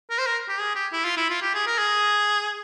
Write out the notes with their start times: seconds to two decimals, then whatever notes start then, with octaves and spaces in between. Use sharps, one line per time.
0.10 A#4
0.18 C5
0.26 A#4
0.49 G4
0.59 G#4
0.75 G4
0.93 E4
1.05 F4
1.17 E4
1.30 F4
1.42 G4
1.54 G#4
1.67 A#4
1.78 G#4